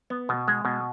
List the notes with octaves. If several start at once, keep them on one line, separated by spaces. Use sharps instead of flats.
B3
B2
G#3
B2